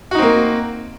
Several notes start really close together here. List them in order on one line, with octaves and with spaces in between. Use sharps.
F#4 D#4 C4 A#3